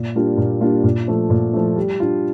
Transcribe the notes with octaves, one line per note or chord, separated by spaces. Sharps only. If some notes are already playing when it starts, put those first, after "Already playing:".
Already playing: A#2
G3 A#3 D4 F4
A#2
G3 A#3 D4 F4
A#2
F3 A3
A#2
F3 A3
G3
D4 F4